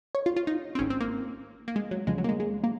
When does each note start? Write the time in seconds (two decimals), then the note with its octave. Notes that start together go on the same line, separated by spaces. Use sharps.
0.15 C#5
0.26 F4
0.36 F4
0.47 D#4
0.75 C4
0.79 G#1 G#2 D#3 C#4
0.90 C4
1.01 A#3
1.68 A#3
1.76 G#3
1.91 F#3
2.07 D#2 C#3 F3 G#3
2.18 F#3
2.24 A#3
2.29 G#3
2.40 G#3
2.64 A#3